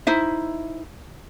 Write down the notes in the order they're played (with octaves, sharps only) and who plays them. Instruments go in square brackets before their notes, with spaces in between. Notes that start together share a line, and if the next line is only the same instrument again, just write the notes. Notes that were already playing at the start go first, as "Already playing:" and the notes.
[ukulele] D#4 E4 C5 E5